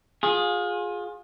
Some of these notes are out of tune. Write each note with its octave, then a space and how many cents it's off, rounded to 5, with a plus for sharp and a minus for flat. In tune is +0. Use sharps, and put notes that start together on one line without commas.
F4 +30 G#4 +0